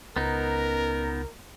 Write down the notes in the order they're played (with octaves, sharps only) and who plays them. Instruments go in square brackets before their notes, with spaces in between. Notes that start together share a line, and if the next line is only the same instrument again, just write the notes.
[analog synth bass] C#2 [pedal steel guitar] B3 D#4 [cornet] A#4